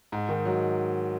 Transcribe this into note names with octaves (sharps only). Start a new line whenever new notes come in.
G#2
D#3
F#3